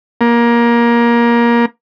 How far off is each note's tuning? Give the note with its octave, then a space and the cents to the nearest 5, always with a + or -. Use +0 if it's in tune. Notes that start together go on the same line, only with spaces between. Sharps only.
A#3 +20